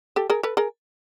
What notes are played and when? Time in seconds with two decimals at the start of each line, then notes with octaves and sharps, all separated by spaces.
0.16 G4 A4
0.30 G#4 A#4
0.43 A4 B4
0.57 G#4 A#4